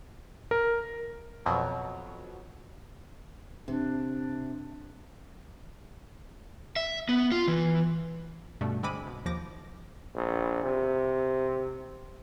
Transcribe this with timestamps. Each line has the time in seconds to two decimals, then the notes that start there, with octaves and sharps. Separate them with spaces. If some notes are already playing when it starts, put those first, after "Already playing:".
0.51 A#4
1.46 F2 B2 F#3
3.68 C3 D4
6.76 E5
7.09 B3
7.32 F4
7.48 E3
8.61 G2 B2 G3 A3
8.83 D3 G#3 C4 B5 D6 D#7
9.07 B1
9.26 D#2 F3 D6 A#6
10.15 A#1
10.64 C3